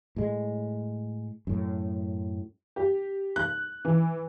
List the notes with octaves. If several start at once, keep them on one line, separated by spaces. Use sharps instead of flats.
A2 G#3
F#2 A2
G4
F#6
E3